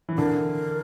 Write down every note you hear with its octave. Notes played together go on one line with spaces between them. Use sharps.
E3
D3 A#4